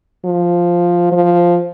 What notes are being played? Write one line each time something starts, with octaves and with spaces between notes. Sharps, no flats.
F3
F3